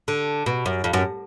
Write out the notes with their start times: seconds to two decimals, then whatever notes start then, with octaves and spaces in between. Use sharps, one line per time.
0.08 D3
0.46 B2
0.66 F#2
0.84 F2
0.93 F#2